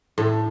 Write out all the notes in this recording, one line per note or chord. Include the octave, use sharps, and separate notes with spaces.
A2